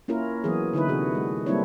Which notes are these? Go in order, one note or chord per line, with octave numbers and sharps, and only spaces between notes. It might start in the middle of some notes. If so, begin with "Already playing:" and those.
A#3 C#4 E4 F4 A#4
E3 F#3 B3 G#4
D3 D#4 E4 B4
C3 F#4 G#4
G#3
G3 A#3 C4 D4 E4 C#5